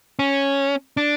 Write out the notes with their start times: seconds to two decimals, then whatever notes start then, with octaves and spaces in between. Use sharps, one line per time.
0.19 C#4
0.97 D4